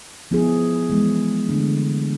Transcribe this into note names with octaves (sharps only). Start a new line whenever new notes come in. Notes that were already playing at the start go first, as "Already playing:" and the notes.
F3 B3 E4 G#4
E3 G#3 B3
D3 F3 A3 D4